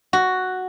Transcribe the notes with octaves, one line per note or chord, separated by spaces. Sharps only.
F#4